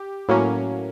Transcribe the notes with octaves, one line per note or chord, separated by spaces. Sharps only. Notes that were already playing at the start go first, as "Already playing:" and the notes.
Already playing: G4
A2 F#3 A#3 C#4